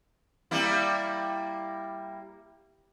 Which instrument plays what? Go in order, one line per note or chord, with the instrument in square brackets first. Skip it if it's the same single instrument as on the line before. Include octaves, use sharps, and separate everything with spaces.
[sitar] G3 A#3 E4